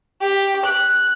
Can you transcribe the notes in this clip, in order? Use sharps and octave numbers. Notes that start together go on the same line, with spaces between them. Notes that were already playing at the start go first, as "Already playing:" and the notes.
G4
F#6